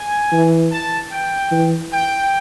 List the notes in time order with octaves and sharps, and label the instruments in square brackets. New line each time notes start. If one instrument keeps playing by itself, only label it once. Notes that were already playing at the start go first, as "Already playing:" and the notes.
Already playing: [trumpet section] G#5
[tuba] E3
[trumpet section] A5
G5
[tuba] E3
[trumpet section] G5